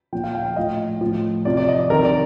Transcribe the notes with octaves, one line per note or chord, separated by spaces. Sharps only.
A#2 F3 G5
F5
G5
F5
A2 F3 D#5
A2 F3
C3 F3 D5
D5
D#5
D5
C3 D#3 A#4
D5